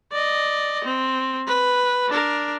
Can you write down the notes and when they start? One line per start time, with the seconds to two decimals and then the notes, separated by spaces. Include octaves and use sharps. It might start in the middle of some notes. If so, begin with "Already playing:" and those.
0.12 D5 D#5
0.85 C4
1.47 B4
2.09 D4 A#4